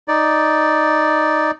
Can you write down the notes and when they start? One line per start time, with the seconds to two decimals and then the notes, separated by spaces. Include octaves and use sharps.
0.08 D#4 D5